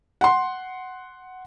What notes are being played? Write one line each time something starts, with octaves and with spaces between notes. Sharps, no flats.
F#5 C6